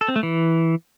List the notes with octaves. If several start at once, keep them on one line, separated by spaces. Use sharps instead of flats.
A4
C4
A3
E3